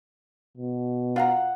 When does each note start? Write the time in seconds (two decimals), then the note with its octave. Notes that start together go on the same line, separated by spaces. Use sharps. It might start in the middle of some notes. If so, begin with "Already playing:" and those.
0.57 B2
1.16 F4 F5 F#5 A#5